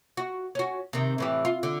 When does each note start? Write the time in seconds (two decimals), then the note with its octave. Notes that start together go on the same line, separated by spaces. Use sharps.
0.17 F#4
0.55 C#4 F#4
0.93 C3 D#3
1.18 A2 E3 G4
1.45 F4
1.63 D3